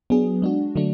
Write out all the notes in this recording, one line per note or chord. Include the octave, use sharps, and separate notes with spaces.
F#3 B3 D4 G#4
G#3 D4 F#4
D3 F#3 A3 D4